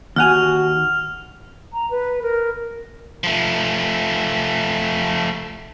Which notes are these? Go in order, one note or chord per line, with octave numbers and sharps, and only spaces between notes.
D#2 F#4 F#5 G#5 F6 F7
A#5
B4
A#4
F3 A3